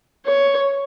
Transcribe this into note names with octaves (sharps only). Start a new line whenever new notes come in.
C#5